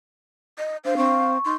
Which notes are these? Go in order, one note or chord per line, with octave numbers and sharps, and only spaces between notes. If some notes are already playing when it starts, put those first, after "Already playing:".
D#5
D4 C5 F5
C4 C#6
D#4 C6